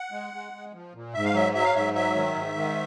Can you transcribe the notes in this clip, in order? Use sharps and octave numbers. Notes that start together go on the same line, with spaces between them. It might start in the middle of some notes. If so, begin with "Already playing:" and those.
Already playing: F#5
G#3
G#3
G#3
F3
A#2
G#2 E5
F5
F#3 E5
F#3 E5
F5
G#2 E5
F#3 E5
D#3
G#2
D#3